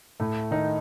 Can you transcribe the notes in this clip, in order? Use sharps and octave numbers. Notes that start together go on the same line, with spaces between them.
A2 A3
D#3 D#4